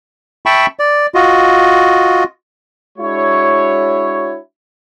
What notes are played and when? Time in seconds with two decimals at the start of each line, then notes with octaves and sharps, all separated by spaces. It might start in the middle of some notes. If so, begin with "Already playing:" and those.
0.46 E5 G5 A5 B5 C#6
0.79 D5
1.15 F4 F#4 D#5
2.99 G#3 D4 E4 F#4 C#5